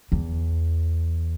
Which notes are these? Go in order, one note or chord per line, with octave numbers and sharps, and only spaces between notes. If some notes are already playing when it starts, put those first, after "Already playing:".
E2